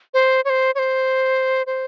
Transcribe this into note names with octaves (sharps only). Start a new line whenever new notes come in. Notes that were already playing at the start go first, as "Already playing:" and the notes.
C5
C#5
C5
C#5
C5
C5